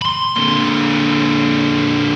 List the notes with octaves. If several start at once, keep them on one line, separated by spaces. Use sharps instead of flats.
B5 C6
A#2 D3